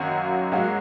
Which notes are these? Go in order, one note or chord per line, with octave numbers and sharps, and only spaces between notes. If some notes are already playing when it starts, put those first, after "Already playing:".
Already playing: F#2 D#3 F#3 A#3 F#4
G#2 F#3 A#3 F#4